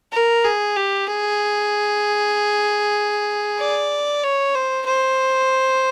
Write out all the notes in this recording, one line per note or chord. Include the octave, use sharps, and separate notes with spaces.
A#4
G#4
G4
G#4
D5
C#5
C5
C5